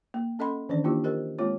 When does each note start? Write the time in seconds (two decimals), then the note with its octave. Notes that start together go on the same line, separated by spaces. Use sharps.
0.14 A#3
0.39 C#4 A4 D#5 F#5 B5 C6
0.69 D#3 E3 C#4 D4 D5
0.84 A#3 D4 E4 F4 G4
1.04 G4 A#4 C5 D#5
1.39 G#3 A#3 C4 F4 C#5